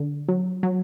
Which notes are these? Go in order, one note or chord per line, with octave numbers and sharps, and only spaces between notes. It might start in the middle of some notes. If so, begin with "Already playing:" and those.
Already playing: D3
F#3
F#3